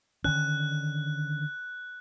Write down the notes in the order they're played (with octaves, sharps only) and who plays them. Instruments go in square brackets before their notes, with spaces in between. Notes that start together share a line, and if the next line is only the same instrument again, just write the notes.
[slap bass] D3 D#3 C#4 [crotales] F#6